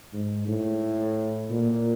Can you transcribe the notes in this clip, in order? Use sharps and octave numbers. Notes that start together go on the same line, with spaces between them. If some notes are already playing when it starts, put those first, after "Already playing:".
G#2
A2
A#2